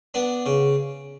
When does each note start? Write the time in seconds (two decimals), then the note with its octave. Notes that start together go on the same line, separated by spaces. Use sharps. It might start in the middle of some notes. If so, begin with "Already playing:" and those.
0.14 B3 D4
0.46 C#3